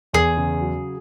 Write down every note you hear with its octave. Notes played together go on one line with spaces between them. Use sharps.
E2 G#4
C#3
F#3